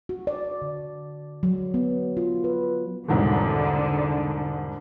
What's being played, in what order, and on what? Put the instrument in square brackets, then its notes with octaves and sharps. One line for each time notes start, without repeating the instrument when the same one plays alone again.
[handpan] F#4
D5
D3
F#3
B3
F4
B4
[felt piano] E1 C2 G#2 [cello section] D3